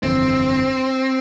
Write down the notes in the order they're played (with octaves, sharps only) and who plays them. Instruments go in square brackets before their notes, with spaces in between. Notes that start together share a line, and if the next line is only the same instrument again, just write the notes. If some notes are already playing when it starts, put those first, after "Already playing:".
[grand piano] G1 F2 E3 [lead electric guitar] C4